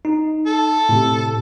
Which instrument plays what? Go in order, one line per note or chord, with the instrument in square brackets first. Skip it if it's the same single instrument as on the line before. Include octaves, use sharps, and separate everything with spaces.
[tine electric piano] D#4
[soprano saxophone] A4
[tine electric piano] A2 C3